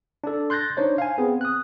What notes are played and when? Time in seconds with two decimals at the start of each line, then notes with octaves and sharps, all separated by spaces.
0.24 D4 A4
0.50 C6 F#6 G6 A6 A#6
0.77 D4 D#4 C5 C#5
0.98 F5 G#5
1.18 B3 C4 G#4
1.41 D#6 F#6